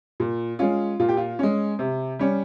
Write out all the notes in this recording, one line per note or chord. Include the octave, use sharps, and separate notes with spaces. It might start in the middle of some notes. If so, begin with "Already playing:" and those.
A#2
G#3 C#4 F4
A#2 F4
G4
F4
G#3 C#4
C3
G3 C#4